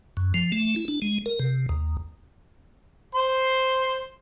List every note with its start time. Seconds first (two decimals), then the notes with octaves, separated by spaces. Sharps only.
0.17 F#2
0.34 F3
0.52 A3
0.76 E4
0.88 D4
1.02 G#3
1.26 A#4
1.40 C3
1.69 D#2
3.15 C5 C6